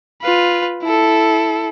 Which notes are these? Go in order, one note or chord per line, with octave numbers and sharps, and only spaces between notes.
F4 B4
E4 A4